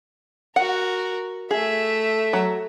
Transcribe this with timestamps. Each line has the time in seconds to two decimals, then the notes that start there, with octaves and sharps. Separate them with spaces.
0.56 F#4 A#4 F#5
1.51 A3 G#4 E5
2.33 F#3